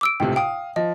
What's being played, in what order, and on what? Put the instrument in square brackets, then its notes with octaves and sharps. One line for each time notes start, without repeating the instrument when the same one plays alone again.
[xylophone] D6 E6 D7
[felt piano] C#2 A2 C3 [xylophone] G5
[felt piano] F5 D#6 [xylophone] G5
[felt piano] F3 [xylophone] D#5